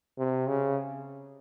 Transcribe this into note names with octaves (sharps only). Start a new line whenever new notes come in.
C3
C#3